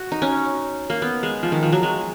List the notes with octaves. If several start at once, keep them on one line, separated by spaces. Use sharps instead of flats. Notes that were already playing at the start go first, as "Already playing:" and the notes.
Already playing: F#4
D#4
C#4
A#3
B3
G#3
F3
D#3
F3
F#3
G#3